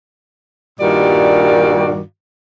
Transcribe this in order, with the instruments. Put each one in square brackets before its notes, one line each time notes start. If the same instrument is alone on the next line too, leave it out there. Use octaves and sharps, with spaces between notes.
[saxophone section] G2 A#2 D#3 G3 F#4 D5